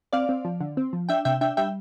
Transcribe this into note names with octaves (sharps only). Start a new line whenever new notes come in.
C4 D5 F5
C4
F3
D3
C4
F3
D4 E5 G5
C3 E5 G5
D4 E5 G5
G3 E5 G5